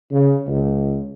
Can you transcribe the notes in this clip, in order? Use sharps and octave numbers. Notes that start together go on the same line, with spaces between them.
C#3
C#2